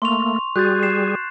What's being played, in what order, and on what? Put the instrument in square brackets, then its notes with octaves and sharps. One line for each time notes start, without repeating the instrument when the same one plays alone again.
[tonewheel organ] A3 A#3 [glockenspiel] C6 C#6 F7
[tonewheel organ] G3 G#4 [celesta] F#4 [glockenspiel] F#6 G6 A6
[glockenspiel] C7 E7